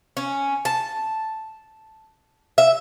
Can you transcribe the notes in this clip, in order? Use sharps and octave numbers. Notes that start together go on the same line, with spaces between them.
C#4
A5
E5